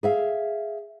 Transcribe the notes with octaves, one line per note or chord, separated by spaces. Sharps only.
G#4 E5 F5